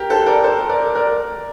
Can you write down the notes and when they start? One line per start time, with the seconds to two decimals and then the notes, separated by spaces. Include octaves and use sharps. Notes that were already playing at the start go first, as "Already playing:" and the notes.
Already playing: G4 A#4
0.10 A4 C5
0.26 A#4 D5
0.44 A4 C5
0.69 A#4 D5
0.95 A#4 D5